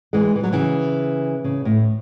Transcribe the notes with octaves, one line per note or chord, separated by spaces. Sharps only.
E3 G#3
E3
F#3
C#3 E3
C#3
A2